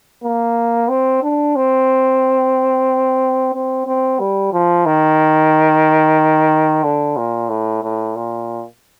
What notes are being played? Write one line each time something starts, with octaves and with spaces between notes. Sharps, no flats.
A#3
C4
D4
C4
C4
C4
G3
F3
D#3
D3
A#2
A2
A2
A#2